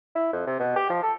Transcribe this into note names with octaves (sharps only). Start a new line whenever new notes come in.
E4
F2
C3
B2
G4
F3
A4